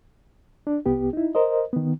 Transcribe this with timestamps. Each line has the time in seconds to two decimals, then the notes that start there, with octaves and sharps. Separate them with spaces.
0.67 D4
0.86 C2 B3 G4
1.13 D#4 E4
1.35 A#4 C5 D#5
1.73 D#3 B3